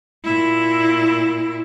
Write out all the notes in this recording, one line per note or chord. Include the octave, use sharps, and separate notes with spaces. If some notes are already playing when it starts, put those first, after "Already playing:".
A#2 E4